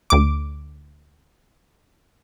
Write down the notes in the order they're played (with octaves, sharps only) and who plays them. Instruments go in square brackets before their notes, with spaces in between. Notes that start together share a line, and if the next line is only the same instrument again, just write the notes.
[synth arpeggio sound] D2 D6